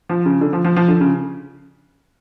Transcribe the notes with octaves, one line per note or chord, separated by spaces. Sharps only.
F3
C#3
D3
F3
F3
F3
D3
C#3